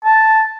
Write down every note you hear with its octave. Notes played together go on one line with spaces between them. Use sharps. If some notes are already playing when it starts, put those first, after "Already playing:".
A5